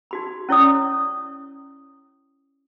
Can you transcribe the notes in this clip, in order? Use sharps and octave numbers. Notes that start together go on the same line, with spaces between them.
D#4 F#4 B5
C#4 E4 C#5 D5 D#6